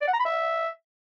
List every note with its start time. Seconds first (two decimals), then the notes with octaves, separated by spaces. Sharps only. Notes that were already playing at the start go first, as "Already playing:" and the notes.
0.01 D5
0.07 F#5
0.13 A#5
0.19 B5
0.25 E5